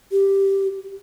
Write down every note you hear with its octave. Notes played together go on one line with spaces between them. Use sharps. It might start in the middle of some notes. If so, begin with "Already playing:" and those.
G4